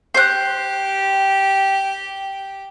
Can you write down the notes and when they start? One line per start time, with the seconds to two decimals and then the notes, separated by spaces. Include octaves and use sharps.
0.14 G4 C5 F#6